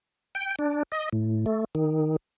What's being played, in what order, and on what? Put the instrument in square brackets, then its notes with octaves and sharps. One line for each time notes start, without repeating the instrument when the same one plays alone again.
[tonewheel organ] G5
D4
D#5
A2
A3
D#3